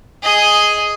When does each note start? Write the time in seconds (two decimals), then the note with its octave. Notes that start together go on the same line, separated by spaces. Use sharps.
0.23 G#4 D#5